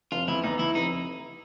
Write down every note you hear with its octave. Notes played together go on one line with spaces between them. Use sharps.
F1 F4
E2 E4
E2 D#4
E3 E4
F1 D#4